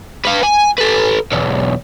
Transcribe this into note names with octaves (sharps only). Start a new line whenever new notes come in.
B4 F5
G#5
A4 B4
B1 E2